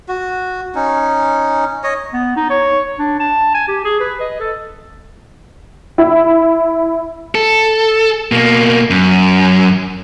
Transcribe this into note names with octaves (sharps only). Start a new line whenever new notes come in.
F#4
C#4 D#4
C#5 D#5
B3
D#4
C#5
D4
A5
G#5
G4
G#4
B4
D#5
A4
E4
A4
B2 A#3
F#2